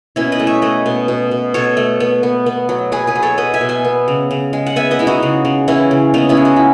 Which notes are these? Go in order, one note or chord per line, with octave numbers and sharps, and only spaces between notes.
B2 C#4 E4
B4 D#5
A3
C#5 E5
A3 B4 D#5
B2
B2
B2
B2 A4 C#5
A3
B3
B3
B3
F#3
F#3 G#4 B4
G#4 B4
F#3
A4 C#5
F#3 B4 D#5
E5 G#5
B2
E5 G#5
B3
C#3
C#3
G#3
F#5
B3 E5 G#5
B4 D#5
G#3 E4
D#4 F#4
C#3
C#3
E3 C#4 E4
C#3
C#3 B3 D#4
C#4 E4
G#3
F#4
E4